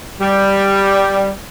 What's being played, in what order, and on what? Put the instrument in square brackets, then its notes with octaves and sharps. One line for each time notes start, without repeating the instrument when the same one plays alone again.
[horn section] G3